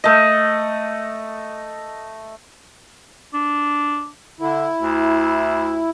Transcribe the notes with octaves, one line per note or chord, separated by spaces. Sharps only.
A3 D#5
D4
D3 E4
D2